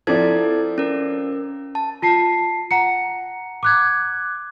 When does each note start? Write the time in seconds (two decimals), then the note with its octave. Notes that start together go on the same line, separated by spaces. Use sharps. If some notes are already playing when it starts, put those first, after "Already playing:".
0.07 F3 C4 E4 A4 D5 G#6
0.78 C#4 A#4
1.75 A5
2.02 F4 A5 C7
2.71 F#5 A#5 C#7
3.63 D6 F#6 G#6